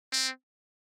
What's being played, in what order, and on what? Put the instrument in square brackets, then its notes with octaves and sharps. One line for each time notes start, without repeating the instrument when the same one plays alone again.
[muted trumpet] C4